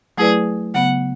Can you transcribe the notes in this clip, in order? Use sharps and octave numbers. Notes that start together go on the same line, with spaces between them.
F#3 A3 E4 G#4 B4 D5
C#3 F#3 B3 F#5